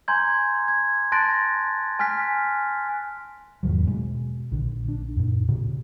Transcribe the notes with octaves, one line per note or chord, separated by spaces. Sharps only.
G#5 A#5 C6 G6 G#6
G#6
A5 C6 F#6 A6 A#6 D7
G#5 F6 F#6 B6
E2 G#2 D#3 F#3
B2 G#3
A#1 D3
D4
F#2 A#2
A2 C#3